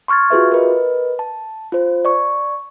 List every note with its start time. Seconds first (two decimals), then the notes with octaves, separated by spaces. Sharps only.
0.08 C6 C#6 F6 G#6 A6
0.30 F4 F#4 G#4 B4 E5
0.52 A#4 B4 D#5
1.19 A5
1.72 F4 C5
2.05 D5 C#6